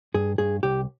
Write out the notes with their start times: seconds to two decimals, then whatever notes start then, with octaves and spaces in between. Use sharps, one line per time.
0.14 G2 G#4
0.38 G2 G#4
0.63 C2 G4